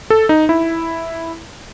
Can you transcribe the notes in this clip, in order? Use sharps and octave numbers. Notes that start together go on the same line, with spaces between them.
A4
D#4
E4